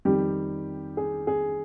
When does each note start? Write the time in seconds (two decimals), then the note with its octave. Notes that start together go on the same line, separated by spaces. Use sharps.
0.05 F2 D#3 G3 G4
0.97 G#4
1.27 G#4